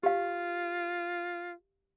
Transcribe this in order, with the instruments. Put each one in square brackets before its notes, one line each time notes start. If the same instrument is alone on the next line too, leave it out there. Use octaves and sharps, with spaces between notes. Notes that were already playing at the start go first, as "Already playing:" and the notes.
[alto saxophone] F4 [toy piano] G4 F5